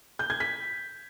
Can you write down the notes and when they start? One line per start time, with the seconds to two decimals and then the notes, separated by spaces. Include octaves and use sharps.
0.19 G6
0.30 G#6
0.40 B6